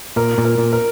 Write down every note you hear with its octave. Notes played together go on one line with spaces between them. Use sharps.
A#2 A#4
A#2
A#4
A#2
A#4